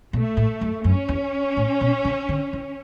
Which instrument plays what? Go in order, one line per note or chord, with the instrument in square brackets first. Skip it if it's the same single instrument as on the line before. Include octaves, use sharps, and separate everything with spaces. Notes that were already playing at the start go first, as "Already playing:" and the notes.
[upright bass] B2 [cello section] A3
[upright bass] A2
F#2
[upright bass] F#2 [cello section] C#4
[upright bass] E2
A2
B2
C#3
D3
E3